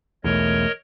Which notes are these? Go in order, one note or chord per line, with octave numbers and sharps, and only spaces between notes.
B1 E2 A3 A#4 C#5 D#5